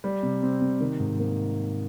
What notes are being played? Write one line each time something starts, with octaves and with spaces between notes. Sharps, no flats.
G3
C3
C4
C3
D#3
G#2
A#3